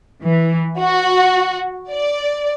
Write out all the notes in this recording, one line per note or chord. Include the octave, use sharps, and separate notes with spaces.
E3
F#4
D5